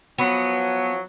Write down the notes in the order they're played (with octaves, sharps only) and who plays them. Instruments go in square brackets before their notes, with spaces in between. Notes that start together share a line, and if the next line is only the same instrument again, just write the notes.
[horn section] F3 F#3 [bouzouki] B3